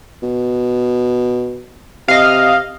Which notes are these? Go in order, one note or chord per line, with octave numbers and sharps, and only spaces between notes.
B2
C3 D#5 F5